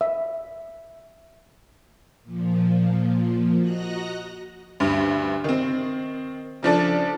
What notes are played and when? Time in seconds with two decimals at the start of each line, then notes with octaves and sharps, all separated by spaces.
0.01 E5
2.23 A#2 F3
3.58 F#4 D#5 A#5 F#6 A#6
4.80 D2 G2
5.44 D#3 C4
6.63 C#3 F3 D4 A4